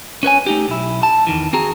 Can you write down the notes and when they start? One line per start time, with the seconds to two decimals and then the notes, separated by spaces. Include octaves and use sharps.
0.23 C#4 B4 C#5 G#5
0.46 A3 D#4 G4
0.68 B1 E4
1.03 A5
1.27 E2 D#3 E3
1.53 C4 F#4 G#4 A#5